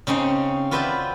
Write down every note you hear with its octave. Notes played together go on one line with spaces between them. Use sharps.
C#3 C4 C#4 D#4
F4 F#4 B4 D5 E5 G5